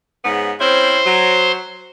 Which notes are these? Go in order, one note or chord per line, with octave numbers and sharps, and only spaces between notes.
G#2 C#3 B3
C4 C#4 E4 C5
F#3